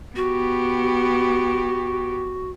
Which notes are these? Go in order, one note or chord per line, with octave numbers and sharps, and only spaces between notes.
B3 F#4 G4